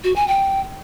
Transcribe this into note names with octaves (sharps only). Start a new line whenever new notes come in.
F#4
G#5
G5